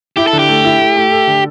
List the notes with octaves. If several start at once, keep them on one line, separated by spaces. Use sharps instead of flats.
E4 G4
A4
D3
G4
A3
E4
A3
A3
A4
D3